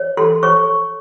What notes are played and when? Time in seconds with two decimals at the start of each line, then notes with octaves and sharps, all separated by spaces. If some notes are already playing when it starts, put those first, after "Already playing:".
Already playing: C#5
0.17 A4 C6
0.43 C#5 C#6